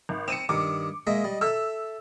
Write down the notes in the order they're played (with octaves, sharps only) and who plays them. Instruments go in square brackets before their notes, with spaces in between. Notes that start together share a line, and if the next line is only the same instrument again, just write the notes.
[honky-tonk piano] G#1
[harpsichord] C4 [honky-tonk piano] C#7 D#7 E7
[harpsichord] G2 D#3 [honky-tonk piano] D6
[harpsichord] G#3 A#3 E5 [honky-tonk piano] D#5
[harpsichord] G3
[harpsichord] A4 E5 [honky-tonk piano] E6